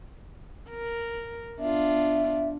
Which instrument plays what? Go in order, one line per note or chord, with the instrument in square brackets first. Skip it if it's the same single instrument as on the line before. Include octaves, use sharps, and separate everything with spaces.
[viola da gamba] A#4
[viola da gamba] B3 D4 F4 [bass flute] E5